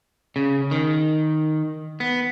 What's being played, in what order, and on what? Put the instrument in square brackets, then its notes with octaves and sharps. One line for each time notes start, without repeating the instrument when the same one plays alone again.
[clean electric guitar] C#3
D#3
B3